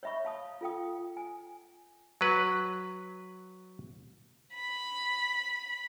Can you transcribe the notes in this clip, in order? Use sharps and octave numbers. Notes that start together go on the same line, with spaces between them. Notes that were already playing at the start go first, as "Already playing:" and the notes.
C#5 D#5 E5 B5 C#6
F5 A5 D#6
F4 A4 F5 G5 D#6
G#5
F#3 B4
B5